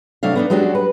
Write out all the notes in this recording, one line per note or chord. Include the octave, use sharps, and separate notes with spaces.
C3 F#3 A3 D4 F5
B3 D4 D#4
F#3 G#3 C#4 D4 F#4 G4
B4